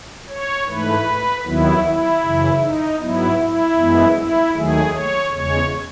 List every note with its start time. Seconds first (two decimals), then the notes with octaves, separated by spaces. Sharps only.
0.28 C#5
0.67 G#2 E3 A3 B4
1.45 D#2 D#3 F#3 B3 E4
1.84 E4
2.22 F#2 C#3 E3
2.61 D#4
3.00 G#2 F#3 B3 E4
3.38 E4
3.77 F#2 E3 G#3 B3
4.16 E4
4.54 D#2 D#3 F#3 A3 G#4
4.93 C#5
5.31 E2 C#3 G#3 C#5